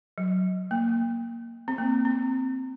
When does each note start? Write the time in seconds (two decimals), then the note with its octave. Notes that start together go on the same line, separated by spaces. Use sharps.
0.18 F#3
0.71 A#3
1.68 C4
1.78 A#3
2.05 C4